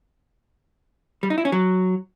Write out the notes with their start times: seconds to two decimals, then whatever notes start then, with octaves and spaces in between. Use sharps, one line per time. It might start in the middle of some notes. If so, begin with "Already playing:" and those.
1.23 G3
1.30 D#4
1.38 E4
1.45 C#4
1.52 F#3